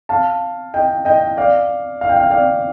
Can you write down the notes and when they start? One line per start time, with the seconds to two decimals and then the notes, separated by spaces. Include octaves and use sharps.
0.09 F5 A5
0.74 D#5 G5
1.05 D#5 G5
1.37 D5 F5
2.01 F5
2.09 G5
2.17 F5
2.24 G5
2.31 D5 F5